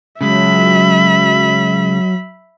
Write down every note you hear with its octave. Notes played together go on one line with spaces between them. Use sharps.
C#3 F#3 G#3 E5 B5